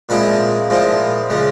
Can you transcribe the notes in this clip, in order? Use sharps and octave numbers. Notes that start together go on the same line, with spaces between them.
A#2 F3 G#3 C4 E4 B5
A#2 F3 G#3 C4 E4
C#3 F3 G#3